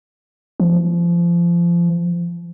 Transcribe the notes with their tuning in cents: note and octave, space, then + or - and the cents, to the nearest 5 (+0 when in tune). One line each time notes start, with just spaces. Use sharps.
F3 -25